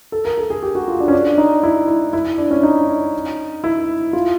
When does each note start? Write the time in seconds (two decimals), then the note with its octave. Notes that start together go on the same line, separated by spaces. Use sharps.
0.12 A4
0.25 A#4
0.38 A4
0.50 G#4
0.62 G4
0.75 F#4
0.88 F4
1.00 D4
1.08 C#4
1.13 D4
1.38 D#4
1.63 E4
1.88 E4
2.13 E4
2.38 D4
2.51 C#4
2.63 D#4
3.64 E4
4.13 F4